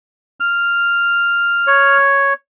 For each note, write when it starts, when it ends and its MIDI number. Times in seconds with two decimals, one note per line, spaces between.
0.40 1.97 89
1.67 2.33 73